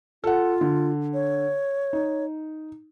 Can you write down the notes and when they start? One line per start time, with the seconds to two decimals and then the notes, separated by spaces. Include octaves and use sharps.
0.24 F4 A4 F#5
0.61 D3
1.14 C#5
1.93 D#4